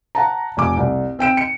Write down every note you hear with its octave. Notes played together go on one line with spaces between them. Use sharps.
F#5 A5 A#5
F1 G#5 D6
C2
C4 G5 D7 E7
C#7